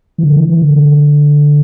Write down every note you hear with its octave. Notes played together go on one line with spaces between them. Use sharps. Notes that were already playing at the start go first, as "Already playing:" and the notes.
E3
D3
E3
E3
D3
D3